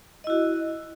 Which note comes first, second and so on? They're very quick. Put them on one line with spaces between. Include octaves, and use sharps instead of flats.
D#5 E4 F#4